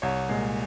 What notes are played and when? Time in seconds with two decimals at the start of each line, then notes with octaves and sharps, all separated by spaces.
0.02 C2 C#5
0.29 A#2 G#3